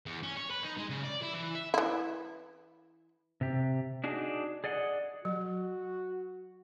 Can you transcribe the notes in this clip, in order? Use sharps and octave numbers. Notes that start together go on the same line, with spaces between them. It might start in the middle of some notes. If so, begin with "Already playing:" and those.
E2
C#4
C#5
B4
D#4
G#3
C#3
D5
E4
E3
E5
E3 E4
C3 G4
D4 D#4 F#4 G#4
G#4 D5 D#5 F#5
F#3 F#4